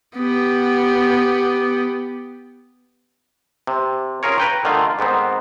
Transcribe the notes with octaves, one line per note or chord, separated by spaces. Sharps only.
B3 G4
C3
C#4 F4 G#4 A#4 C#5
B4 G5 A#5
D3 D#3 A3 F4
G#2 D#3 B3 C4